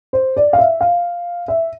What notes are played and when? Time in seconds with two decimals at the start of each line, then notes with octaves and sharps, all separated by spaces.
0.13 C5
0.37 D5
0.53 F5
0.58 E5
0.81 F5
1.48 E5